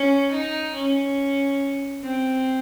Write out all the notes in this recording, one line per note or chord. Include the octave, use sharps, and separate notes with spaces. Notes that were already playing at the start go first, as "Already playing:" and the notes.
Already playing: C#4
D#4
C#4
C4